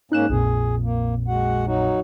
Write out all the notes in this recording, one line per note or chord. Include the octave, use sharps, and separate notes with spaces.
G#2 A#3 C#4 D#4 F#6 E7
A#1 F2 A#2 G#4
A#3
G#3 F#4 F#5
F#3 D#4 F#4